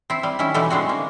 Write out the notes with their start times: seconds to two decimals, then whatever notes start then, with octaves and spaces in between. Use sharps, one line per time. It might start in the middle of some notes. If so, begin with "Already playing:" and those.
0.10 C4 E4
0.23 G3
0.39 D#3 C#4 E4
0.54 B2 D3 E3 G3 A3
0.70 D3 G#3 C4 F#4
0.89 A#3